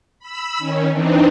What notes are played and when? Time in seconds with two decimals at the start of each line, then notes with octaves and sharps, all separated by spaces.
0.19 B5 E6
0.58 D#3 C#4
0.91 E3 C4 D4 D#4